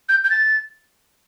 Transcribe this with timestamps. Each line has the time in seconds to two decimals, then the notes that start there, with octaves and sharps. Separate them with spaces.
0.09 G6
0.24 G6
0.30 A6